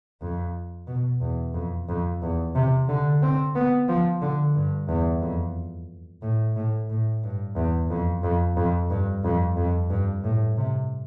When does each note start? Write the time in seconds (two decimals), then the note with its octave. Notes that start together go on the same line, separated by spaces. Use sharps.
0.21 F2
0.87 B2
1.21 E2
1.54 F2
1.88 F2
2.22 E2
2.55 C3
2.88 D3
3.22 C4
3.55 B3
3.89 F3
4.22 D3
4.55 G2
4.89 E2
5.22 F2
6.22 A2
6.56 A2
6.90 A2
7.24 G2
7.56 E2
7.90 F2
8.23 F2
8.57 F2
8.90 G2
9.24 F2
9.57 F2
9.90 G2
10.24 A2
10.57 C3